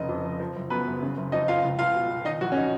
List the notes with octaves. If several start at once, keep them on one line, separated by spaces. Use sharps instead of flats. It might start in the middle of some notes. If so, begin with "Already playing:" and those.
Already playing: F1 C#3 D#4 D#5
F2
F3
F3
F#1
F#2 B3 B4
F#1
C#3
F#1
F2 D#4 D#5
F3 F4 F5
C#2
C#2 F4 F5
B2
B2
D#3 D#4 D#5
A#1 F#3 F#4
C#4
D#4